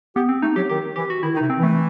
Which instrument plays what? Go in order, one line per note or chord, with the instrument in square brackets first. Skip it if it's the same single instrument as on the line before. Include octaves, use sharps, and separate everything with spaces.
[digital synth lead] B3 [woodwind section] G4
[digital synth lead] C4
[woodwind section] A3 [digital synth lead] D#4
[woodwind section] F#3 [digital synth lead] G4
[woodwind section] D#3 [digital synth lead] G4
[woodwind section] E3 [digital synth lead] G4
[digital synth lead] F#4
[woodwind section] D#3 [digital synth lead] E4
[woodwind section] D#3
[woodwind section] C3 [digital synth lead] D#4
[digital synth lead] C4
[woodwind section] E3 [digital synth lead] A3